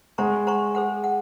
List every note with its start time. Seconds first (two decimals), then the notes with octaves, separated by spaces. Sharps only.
0.18 G#3 C5 F#5 A#5 C#6
0.47 C5 F#5 A#5 C#6
0.75 G#4 C5 F#5
1.04 F#5